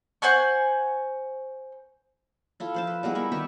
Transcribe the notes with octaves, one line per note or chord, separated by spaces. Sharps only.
C5 F#5 G#5 C#6
E4 F4 A4
F3 C5 A5
B4
G3 G#3 B3 E4
B3 A#4 B5 C#6
D#3 G4 E5 C#6